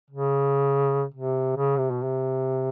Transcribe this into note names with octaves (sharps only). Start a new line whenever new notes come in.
C#3
C3
C#3
C3
B2
C3